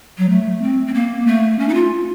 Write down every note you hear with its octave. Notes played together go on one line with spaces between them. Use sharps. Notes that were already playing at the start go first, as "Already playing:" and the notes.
F#3
A3
C4
C4
A#3
A3
C#4
D#4
F4